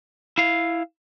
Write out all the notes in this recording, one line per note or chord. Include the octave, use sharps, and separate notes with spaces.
E4 F5